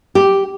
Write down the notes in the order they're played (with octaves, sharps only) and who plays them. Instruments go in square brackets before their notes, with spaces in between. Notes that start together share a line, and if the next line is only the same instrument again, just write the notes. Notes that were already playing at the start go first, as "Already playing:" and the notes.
[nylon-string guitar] G4